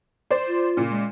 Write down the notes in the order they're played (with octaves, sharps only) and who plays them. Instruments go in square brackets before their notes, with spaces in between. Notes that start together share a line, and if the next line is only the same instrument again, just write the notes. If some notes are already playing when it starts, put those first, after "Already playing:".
[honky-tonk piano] C5 D5
[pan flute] F4
[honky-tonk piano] A#2 C#3
[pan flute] G#3